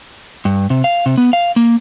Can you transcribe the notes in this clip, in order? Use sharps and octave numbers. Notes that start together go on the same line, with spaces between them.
G2
C3
F5
C3
B3
F5
A#3